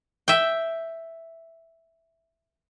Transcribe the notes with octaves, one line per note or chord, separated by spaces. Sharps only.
E5 G5